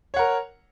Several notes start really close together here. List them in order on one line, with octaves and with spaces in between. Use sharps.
C#5 F#5 A#4